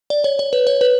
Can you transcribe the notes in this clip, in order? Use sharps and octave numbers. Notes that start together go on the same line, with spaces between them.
D5
C#5
C#5
B4
C#5
B4